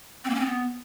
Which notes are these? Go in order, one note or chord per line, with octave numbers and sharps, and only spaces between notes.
C4
A#3
C#4
C4
B3